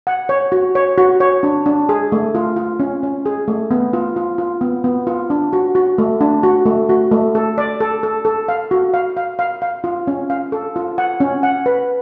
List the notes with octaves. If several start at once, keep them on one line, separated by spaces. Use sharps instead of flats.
F#5
C#5
F#4
C#5
F#4
C#5
D4
D4
G#4
A3
F4
F4
C#4
C#4
G#4
A3
B3
F4
F4
F4
B3
B3
F4
D4
F#4
F#4
A3
D4
F#4
A3
F#4
A3
A4
D5
A4
A4
A4
F5
F#4
F5
F5
F5
F5
F4
C#4
F5
A4
F4
F#5
C#4
F#5
B4